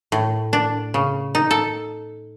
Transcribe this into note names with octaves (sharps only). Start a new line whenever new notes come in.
A2
D4
C#3
D#4
A4